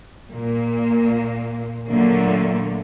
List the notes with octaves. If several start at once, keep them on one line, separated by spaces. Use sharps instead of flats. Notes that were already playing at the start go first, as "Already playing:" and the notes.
A#2 A#3
A#2 D3 F#3 A3 A#3